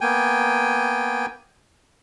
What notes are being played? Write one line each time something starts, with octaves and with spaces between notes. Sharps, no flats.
A#3 B3 G5 G#5